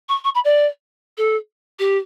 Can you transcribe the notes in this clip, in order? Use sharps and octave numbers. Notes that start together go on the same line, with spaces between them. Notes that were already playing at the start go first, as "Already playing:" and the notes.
C#6
C#6
B5
D5
A4
G4